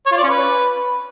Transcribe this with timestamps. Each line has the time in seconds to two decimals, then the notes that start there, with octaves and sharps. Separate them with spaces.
0.06 C#5
0.12 F4
0.18 D5
0.23 C#4
0.29 B4